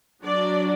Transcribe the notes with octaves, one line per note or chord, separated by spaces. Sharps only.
F#3 D4 D5